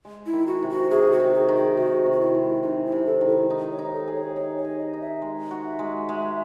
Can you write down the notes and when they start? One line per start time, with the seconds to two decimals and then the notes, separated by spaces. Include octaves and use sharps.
0.05 G#3
0.26 E4
0.33 D#3
0.47 F#4
0.62 C3
0.70 F#4
0.91 C3 G#4
1.12 F#4
1.20 D#3
1.34 G#4
1.49 D#3
1.56 G#4
1.77 C3 F#4
2.06 C3
2.12 F#4
2.20 E4
2.35 G#3
2.63 C3 D#4
2.85 E4
2.92 C3
3.06 A4
3.21 D#3
3.28 E4
3.50 D#4
3.71 C#5
3.79 D#4
3.93 A4
4.08 G#4
4.14 C#5
4.36 D#4 C#5
4.57 C#5
4.65 G#4
4.78 D#5
4.93 D#4
5.01 E5
5.22 G#3
5.51 F#4
5.66 E5
5.79 G#3
6.09 G#3